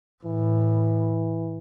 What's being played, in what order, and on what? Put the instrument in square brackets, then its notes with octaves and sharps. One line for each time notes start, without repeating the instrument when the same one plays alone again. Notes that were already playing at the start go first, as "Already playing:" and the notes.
[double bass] A2 [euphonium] E3